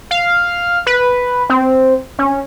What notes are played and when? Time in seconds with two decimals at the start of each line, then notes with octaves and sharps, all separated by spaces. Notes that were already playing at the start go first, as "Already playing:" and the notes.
0.11 F5
0.87 B4
1.50 C4
2.19 C#4